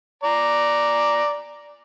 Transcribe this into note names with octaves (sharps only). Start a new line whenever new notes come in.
D5 A#5